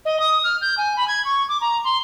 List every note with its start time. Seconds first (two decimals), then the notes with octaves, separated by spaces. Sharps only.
0.05 D#5
0.20 D#6
0.44 F6
0.61 G6
0.77 G#5
0.97 B5
1.08 G#6
1.25 C#6
1.49 D6
1.61 A#5
1.84 C6